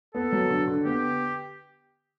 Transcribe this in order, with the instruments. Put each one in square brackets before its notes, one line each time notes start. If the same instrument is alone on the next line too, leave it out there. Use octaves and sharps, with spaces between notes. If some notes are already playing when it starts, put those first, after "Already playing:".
[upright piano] B3 [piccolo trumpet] A4
[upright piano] F#3
D3
D3
[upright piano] B3 [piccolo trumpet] G4